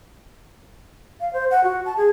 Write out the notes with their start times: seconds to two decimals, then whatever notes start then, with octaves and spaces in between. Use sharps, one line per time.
1.21 F5
1.33 C5
1.51 F#5
1.64 F#4
1.85 A5
1.97 G#4